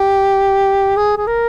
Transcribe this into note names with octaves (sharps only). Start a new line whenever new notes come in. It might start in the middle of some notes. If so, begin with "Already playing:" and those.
Already playing: G4
G#4
G#4
A#4